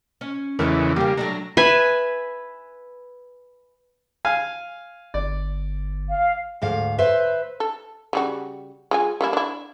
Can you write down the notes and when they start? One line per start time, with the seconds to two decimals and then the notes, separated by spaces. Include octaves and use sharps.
0.21 C#4
0.59 E2 C#3 E3 G#3 A3 A#4
0.96 C#3 G3 A#3 G4
1.17 F#3 A3 D4 A#5
1.57 B4 E5 G#5
4.25 F5 G#5 F6
5.14 G1 D5
6.10 F5
6.62 D2 G#2 F5
6.98 B4 C5 E5
7.60 A4
8.13 C#3 G3 F#4
8.91 G#3 F4 G#5
9.21 G3 A#3 E4
9.33 D4 E4